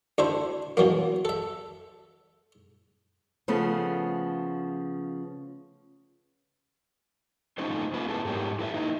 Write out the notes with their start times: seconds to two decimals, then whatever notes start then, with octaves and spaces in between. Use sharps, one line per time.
0.18 D2 D4 E4 C5 B5
0.77 B2 E3 F#3 A#3
1.25 A4 E5
3.48 C#3 F3 A3 B3
7.58 A3 C#4 D#4 F4 A4 C5
7.94 A#3 F4 B4
8.09 A3 B3 E4 G#4 A4
8.25 G#2 G4 A#4 C#5
8.59 E4 A4 B4 E5
8.74 A#3 D#4 E4